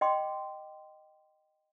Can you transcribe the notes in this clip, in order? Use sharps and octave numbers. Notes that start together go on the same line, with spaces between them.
D#5 G5 C6 D6